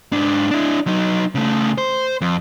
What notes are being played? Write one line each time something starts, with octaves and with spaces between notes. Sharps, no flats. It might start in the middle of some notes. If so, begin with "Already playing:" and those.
G#2 D4
D4 E4
F#3 D#4
C#3 A3
C5
F2